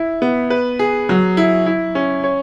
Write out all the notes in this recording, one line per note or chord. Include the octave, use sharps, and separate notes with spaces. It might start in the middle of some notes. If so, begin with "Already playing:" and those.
Already playing: E4
B3
B4
G#4
F#3
E4
E4
C#4
C#5